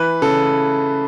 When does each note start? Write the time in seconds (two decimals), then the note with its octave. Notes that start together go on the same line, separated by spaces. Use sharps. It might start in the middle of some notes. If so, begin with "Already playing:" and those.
Already playing: E3 B4
0.22 C#3 A4